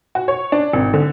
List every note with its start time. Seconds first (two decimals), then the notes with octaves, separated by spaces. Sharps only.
0.15 F#4
0.28 C#5
0.52 D4
0.73 G#1
0.94 D3